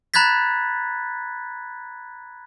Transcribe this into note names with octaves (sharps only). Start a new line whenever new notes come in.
A#5 B5 F#6 G#6 A6 B6